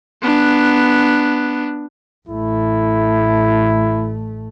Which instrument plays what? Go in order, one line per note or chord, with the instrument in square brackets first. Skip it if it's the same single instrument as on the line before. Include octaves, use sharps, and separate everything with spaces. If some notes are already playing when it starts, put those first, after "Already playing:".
[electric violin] B3 D4
[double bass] A1 A3 [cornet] E4